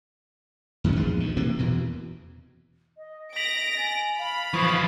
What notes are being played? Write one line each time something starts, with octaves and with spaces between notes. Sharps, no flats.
F#2 D#3 E3 C#4
A#1 E2 F3 G#3
D2 D#3
C3 E3 A#3
E2 B2 E3
D#5
A#6 B6 D7 F7 F#7
G#5 A6
F5 B5
E3 F3 C#6 D#6 C7